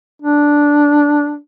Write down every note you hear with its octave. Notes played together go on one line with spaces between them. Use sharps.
D4